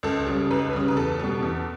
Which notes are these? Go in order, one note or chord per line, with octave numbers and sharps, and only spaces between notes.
C#2 A4
C#3 G3
C#2 B4
C#3 G3
B4
E2 A4
B2 G3
E2